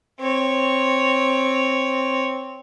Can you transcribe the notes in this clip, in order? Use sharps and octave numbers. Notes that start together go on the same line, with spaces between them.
C4 C#5